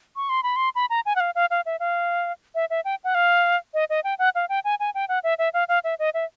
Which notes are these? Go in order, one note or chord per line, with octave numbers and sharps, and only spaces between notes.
C#6
C6
B5
C6
B5
A#5
G#5
F#5
F5
F5
F5
E5
F5
E5
E5
G5
F#5
F5
D#5
D#5
G5
F#5
F5
G5
G#5
G#5
G5
F#5
E5
E5
F5
F5
E5
D#5
E5